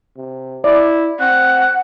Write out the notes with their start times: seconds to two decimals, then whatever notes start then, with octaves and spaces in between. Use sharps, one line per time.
0.16 C3
0.64 E4 D5
1.20 C4 F#5 F#6